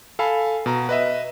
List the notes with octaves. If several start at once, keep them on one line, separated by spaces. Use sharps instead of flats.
A4 F5 G#5 B5
B2 A#5
B4 D#5 E5